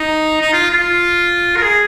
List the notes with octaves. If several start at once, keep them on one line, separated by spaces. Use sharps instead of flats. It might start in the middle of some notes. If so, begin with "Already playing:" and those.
Already playing: D#4
D#4
F4
F4
A#4
G#4